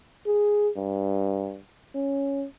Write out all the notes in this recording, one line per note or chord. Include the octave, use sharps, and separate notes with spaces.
G#4
G2
C#4